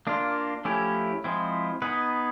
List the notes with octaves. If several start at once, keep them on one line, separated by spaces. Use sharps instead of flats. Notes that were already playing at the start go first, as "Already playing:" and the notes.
A#3 D4 F4
F3 A3 C#4 E4 G4
F3 G#3 C4 E4
B3 D#4 G#4 B4